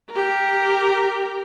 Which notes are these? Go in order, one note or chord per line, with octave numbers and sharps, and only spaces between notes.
G4 A#4